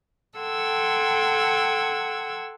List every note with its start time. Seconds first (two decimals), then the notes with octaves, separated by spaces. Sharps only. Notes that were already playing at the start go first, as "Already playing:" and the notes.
0.37 A4 F#5 G5 C6 E6 G#6